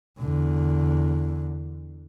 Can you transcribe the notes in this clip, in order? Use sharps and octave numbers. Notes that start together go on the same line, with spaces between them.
E2 D3